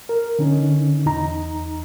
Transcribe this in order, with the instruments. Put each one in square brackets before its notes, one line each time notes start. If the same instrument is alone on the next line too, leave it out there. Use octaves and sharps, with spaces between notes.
[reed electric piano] A#4
D3 C#4 D#4
E2 D#4 A#5